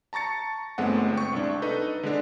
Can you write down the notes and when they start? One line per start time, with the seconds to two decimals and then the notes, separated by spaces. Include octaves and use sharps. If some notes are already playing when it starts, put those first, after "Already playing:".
0.13 A5 A#5 C#6 A6 C#7
0.78 G1 G#3 A3 B3 C4 F#5
1.14 G5 C#6
1.33 C2 D4
1.62 D#4 A4 B4 D#5
2.03 D3 G#3 D4